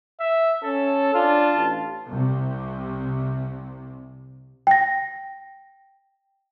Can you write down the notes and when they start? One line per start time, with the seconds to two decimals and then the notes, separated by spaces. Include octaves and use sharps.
0.20 E5
0.64 C#4 A4
1.15 D4 F4 A5
1.54 A1
2.10 C2 C3
4.67 G5 A#6